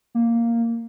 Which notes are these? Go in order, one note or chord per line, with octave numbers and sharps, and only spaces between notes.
A#3